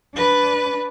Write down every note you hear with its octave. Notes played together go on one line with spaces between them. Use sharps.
D4 B4